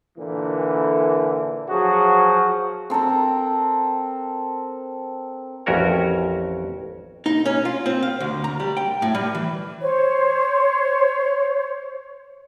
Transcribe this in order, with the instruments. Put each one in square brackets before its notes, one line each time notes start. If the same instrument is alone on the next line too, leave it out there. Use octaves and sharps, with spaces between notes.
[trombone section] A#2 D3 E3
F3 F#3 F#4 G#4
[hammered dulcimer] C4 A4 A#4 A#5
[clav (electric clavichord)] A1 F2 C#4 F#4 A#4 C#5
[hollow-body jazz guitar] D#4
C#4
F4
C4
F5
D2
A#5
G3
G5
A2
G3
E3
[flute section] C5 C#5